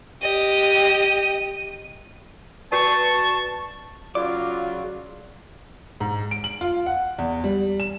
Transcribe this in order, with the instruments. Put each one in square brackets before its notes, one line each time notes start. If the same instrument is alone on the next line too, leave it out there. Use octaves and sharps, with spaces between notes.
[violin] G4 D#5 [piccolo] D#7
[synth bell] F#4 B4 D5 [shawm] A5 [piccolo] C#6
[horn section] C#3 F#3 [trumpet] F4 [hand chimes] D5 [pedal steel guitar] D6
[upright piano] G#2
D7
F#7
F4
F#5
E2
G3
E7